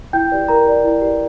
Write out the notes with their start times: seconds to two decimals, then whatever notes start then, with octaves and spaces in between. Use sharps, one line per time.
0.13 E4 G5 G6
0.32 G4 B4 D5
0.48 E4 A#4 A#5
0.66 G4 B4 D5
0.84 E4
1.01 G4 B4 D5